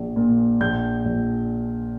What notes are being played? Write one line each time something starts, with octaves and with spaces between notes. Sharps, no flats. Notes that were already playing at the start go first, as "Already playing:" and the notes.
Already playing: A#1
A#2
A#1 G6
A#1